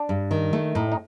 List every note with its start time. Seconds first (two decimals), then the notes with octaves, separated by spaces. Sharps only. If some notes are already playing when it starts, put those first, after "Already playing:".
Already playing: D4
0.09 G2
0.31 D#3
0.53 A3
0.75 A2 D#4
0.92 D#4